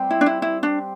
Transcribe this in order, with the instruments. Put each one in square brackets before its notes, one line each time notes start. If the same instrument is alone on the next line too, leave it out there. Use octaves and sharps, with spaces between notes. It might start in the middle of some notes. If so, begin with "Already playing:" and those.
Already playing: [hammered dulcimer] G3 C4 G4 C5
[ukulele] E4
D4
E4
E4
D4